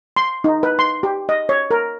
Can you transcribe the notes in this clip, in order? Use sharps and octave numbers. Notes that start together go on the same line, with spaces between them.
C6
D#4
B4
C6
G4
D#5
C#5
A#4